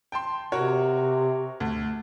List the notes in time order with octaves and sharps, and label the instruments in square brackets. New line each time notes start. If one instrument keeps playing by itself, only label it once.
[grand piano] G5 A5 C6
[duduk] C3 [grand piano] F#4 A#4 C#5
[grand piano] D2